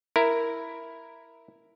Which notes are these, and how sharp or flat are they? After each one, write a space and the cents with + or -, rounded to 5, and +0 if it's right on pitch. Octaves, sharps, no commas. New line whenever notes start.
E4 +0 A#4 +0